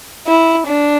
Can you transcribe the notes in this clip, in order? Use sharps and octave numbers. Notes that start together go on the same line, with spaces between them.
E4
D4